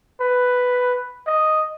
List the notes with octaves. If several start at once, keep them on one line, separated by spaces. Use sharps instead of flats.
B4
D#5